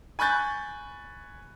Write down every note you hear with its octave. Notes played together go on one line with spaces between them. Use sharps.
G#5 B5 C#6 F#6 G6 A6